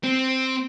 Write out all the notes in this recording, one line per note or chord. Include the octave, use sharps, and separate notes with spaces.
C4